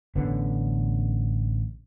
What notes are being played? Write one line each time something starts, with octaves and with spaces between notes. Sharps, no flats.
A1 D3 B3 C#4